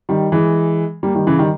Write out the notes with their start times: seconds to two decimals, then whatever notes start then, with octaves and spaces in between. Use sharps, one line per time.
0.09 D#3 G3
0.32 E3 G#3
1.03 G3 A#3
1.15 D#3 G3
1.27 C#3 E3
1.39 D#3 G3